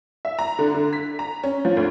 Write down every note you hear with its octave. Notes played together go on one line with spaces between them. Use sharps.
E5
A#5
D3
D3
B6
A#5
C#4
F3
D2